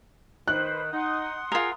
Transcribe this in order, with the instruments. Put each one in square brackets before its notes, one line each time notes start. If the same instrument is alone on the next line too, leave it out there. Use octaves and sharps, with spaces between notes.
[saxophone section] D#3 [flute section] B4 C5 [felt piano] F#6
[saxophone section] D#4 [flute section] F#5 C6 D#6
[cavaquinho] F4 A#4 [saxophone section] G#4